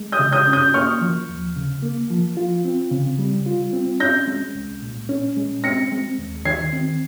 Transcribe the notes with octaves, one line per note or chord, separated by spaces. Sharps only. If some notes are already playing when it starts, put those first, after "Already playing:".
Already playing: G#3
D#6 G6
C#3
D#6 G6
C#4
D#6 G6
A#3 C#6 F6
F3
D#2
C#3
A#3
F3
F4
C4
C#3
G3
F4
C4
C#4 G6 A#6
G#3
C2
A#2
C#4
G#3
C4 A#6 C#7
G#3
D#2
D#3 G#6 C7
C4